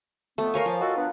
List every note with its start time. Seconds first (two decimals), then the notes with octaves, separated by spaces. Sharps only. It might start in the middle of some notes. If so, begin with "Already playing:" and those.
0.38 F2 A3 B3
0.54 A#3 A#4 C#5 F5 G#5
0.66 F3 F4
0.80 D#4 F#4 A4
0.96 B3 D4